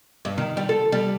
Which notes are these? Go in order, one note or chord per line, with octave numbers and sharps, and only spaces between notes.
G2
D#3
G3
A4
G3